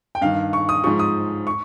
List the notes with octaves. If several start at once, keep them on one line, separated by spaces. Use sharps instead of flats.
G5
G2 D#3 F5
C#6
D#6
G#2 F3 C#6
D#6
C#6